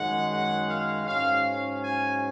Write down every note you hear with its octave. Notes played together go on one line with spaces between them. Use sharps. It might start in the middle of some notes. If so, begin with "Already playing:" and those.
Already playing: F#2 D#3 G#3 F#5
F#5
F5
G#2 F#3 C#4 F5
G#5